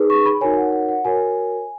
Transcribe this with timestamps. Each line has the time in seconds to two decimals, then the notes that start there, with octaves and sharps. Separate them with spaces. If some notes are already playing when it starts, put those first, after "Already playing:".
Already playing: D#4 G#4 B4
0.10 C#6
0.26 B5
0.41 D#4 F#4 A#4 C#5 G#5
0.57 F#5
0.73 F#5
0.89 F#5
1.05 F#4 A#4 C#5 G#5